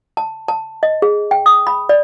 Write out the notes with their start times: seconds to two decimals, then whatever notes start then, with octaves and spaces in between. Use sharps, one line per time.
0.17 A5
0.48 A5
0.83 D#5
1.02 G#4
1.31 G5
1.46 D#6
1.67 B5
1.89 D5